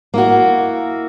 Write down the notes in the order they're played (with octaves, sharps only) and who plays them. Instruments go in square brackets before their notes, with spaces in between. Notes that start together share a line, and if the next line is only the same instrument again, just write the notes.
[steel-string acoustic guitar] A#3 E4 F#4